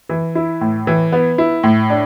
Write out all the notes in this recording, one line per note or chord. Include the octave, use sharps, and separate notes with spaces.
E3
E4
A2
E3
B3
E4
A2
D4